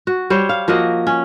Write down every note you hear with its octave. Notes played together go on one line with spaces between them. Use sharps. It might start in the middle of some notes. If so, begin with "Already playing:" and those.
F#4
G3 C5 C#5
F5
F3 A#3 F#4 D#5
C#4